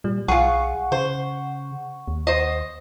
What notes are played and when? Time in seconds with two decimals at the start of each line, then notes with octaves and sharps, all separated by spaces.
0.04 A#2 G3
0.28 B1 F4 G#4 F#5 C#6
0.92 C#3 C5
2.08 D#2
2.27 C5 D#5